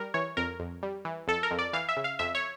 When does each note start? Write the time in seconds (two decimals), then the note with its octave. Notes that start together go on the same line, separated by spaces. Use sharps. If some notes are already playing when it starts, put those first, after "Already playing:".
Already playing: G3 A#4
0.14 E3 C#5
0.37 F2 A#4
0.60 F2
0.83 G3
1.05 E3
1.27 F2 A4
1.43 A#4
1.51 F2
1.59 D5
1.73 E3 F5
1.89 E5
1.97 C#3
2.04 F5
2.19 F2 E5
2.35 C#5